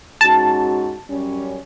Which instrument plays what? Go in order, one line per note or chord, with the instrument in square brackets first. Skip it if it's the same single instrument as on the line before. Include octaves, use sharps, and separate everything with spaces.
[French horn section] G#2 C#4 F#4 [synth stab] A5
[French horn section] F#2 G3 C#4